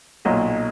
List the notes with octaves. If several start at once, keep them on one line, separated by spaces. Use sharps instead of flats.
B1 A#2 F#3 D#5